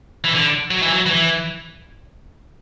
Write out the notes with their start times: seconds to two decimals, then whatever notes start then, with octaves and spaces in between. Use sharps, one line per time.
0.24 E3
0.34 D3
0.71 F#3
0.82 E3
0.93 F#3
1.06 E3